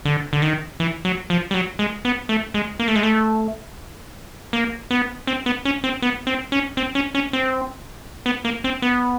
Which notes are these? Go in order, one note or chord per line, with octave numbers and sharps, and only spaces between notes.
D3
D3
D#3
E3
F#3
F3
G3
F#3
G#3
B3
A3
G#3
A#3
A3
G#3
A3
A#3
B3
C4
B3
C#4
C4
B3
C4
C#4
C4
C#4
C#4
C4
B3
A#3
C4
B3